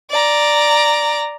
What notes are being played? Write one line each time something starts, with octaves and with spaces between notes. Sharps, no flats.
D5 A#5